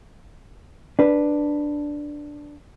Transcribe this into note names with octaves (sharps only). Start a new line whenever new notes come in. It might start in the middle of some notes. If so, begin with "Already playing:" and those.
D4 B4